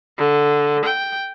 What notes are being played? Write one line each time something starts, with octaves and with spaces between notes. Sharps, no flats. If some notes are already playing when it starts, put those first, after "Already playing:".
D3
G5